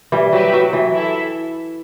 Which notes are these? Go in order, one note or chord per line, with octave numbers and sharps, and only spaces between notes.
E3 G3
F#3 G4 B4 E5
F#3
E3
E4 A4 E5